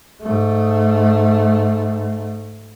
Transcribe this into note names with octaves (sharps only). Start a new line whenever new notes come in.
G#2 A3